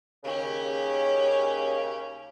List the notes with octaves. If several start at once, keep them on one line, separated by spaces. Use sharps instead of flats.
D#2 C#3 C#4 G4